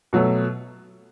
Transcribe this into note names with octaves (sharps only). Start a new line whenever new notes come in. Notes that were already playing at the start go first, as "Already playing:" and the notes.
B2 F#3 A3